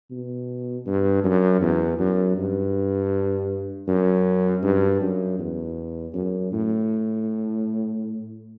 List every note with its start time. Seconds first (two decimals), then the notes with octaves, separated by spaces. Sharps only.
0.11 B2
0.86 G2
1.24 F#2
1.61 E2
1.99 F#2
2.37 G2
3.87 F#2
4.63 G2
5.01 F#2
5.39 E2
6.14 F#2
6.52 A2